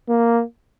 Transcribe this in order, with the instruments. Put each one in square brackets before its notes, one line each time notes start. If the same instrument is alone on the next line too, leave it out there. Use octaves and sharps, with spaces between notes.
[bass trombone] A#3